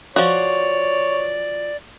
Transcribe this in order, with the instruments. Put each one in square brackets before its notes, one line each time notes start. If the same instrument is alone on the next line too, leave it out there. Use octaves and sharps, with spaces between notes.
[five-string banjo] F3 F#4 [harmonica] C#5 [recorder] D5